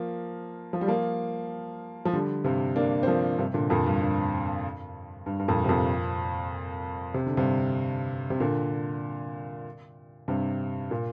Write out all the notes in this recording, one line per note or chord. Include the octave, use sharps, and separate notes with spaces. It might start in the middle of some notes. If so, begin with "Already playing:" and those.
Already playing: F3 A#3
F3
G3
F3 A#3
F3
D3 G3
G2 C3
A#3 D4
C4
F3 A#3
G2 C3
A#2 D3
F2 A#2
G2
G2
G2
G2
F2 A#2
C3
F2 A#2
C3
D3
G2 C3
C3
A#2 D3
G2 C3
A#2